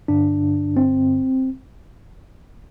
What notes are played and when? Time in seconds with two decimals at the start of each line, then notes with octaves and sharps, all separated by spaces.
0.08 G2 D3 D4
0.77 C4